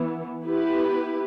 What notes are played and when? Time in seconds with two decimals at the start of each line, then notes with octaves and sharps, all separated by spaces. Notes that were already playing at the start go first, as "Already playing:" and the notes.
Already playing: E3 B3
0.44 B3 E4 G4 B4